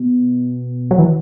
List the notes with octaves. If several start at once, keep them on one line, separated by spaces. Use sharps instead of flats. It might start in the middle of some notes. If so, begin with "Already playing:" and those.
Already playing: B2
F#3
E3